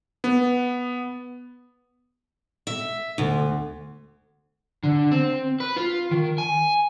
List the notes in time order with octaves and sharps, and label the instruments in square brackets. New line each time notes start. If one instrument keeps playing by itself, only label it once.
[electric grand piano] B3
[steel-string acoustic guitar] E5
D2
[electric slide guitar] D3
C4
B4
F4
D#3
G#5